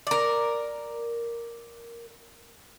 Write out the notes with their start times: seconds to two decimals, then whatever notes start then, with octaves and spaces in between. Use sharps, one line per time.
0.07 A#4 D5